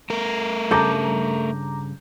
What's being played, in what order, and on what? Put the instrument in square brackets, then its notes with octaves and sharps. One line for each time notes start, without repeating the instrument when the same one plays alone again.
[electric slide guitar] A3 A#4
[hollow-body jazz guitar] G2 C#3 A4 [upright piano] A#5 D6 G6